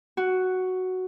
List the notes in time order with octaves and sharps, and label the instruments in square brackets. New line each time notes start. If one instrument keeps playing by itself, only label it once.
[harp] F#4